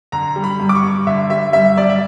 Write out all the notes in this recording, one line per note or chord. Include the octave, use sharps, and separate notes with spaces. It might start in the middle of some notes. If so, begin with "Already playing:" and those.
D3 A#5
G3
B5
G2
D6
C#6
G2
D3 E5
G3 E5
G2 E5
G2 D5
E5